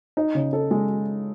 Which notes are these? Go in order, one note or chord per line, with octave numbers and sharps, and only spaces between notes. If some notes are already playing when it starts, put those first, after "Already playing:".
D#4
C#3
A4
G#3